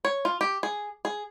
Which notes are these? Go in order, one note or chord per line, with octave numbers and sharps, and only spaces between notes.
C#5
F4
G4
G#4
G#4